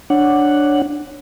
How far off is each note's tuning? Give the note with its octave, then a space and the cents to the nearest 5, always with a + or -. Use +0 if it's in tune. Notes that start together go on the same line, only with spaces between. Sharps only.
D4 +0 C#5 +0 F#5 +0